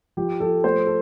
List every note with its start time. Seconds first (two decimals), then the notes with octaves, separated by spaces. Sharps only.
0.17 F3 G4
0.40 F3 A4
0.64 A3 C5
0.87 A4